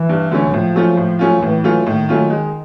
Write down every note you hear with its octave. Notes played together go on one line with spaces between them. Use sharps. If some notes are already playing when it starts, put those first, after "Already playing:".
Already playing: E3
G2
D3 F#3 A3 C#4
A2 F3
F#3 A3 C#4 F4
A2
F#3 A3 C#4 F4
A2 E3
F#3 A3 C#4 F4
A2 D#3
F#3 A3 C#4 F4
G#3